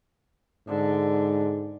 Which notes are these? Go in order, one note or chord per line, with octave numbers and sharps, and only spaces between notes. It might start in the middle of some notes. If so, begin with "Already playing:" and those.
G#2 D3